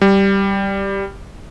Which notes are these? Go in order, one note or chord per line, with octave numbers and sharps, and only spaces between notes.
G3